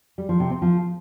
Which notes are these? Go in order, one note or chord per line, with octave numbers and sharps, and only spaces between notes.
G3
F3
C3
C4
F3